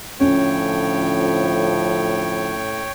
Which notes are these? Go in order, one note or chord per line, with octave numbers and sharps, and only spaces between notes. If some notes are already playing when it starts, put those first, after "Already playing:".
A2 D3 F3 C#4 C#5 G5